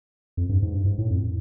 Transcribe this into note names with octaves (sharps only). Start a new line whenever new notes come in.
F2
G2
G#2
G2
G#2
A2
F2